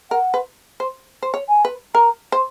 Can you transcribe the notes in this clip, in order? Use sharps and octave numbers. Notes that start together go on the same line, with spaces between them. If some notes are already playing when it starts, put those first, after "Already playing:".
A#4 F#5
B4
C5
C5
C#5
G#5
B4
A#4 A#5
C5